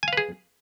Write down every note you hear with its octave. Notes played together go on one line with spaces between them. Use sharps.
G#4 B4 F5 G#5